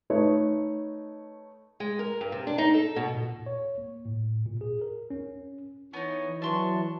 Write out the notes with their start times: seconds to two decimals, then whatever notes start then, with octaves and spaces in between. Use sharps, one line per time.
0.10 A3 D#4 B4 C#5 D#5
1.80 G#3
1.99 A#4
2.21 G2
2.32 C3
2.47 D4
2.58 D#4
2.74 A4
2.96 B2
3.14 A#2
3.46 C#5
3.78 A#3
4.05 A2
4.46 A#2
4.61 G#4
4.82 A#4
5.10 C#4
5.93 E3 B3 D#4 C#5
6.42 E3 F#3 D4 C6 C#6